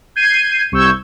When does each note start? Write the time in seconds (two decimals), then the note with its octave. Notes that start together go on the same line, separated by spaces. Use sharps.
0.16 G6 G#6 C7 D#7
0.72 C2 C#6 E6 G6 G#6